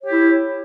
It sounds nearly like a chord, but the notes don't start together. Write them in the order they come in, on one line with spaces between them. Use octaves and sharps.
C#5 G4 E4